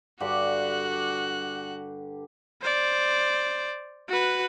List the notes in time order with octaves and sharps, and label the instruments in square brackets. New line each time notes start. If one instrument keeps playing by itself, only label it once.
[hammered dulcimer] G2 D3 G4 [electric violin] F#4 F#6
[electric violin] C5 D5
F#4 B4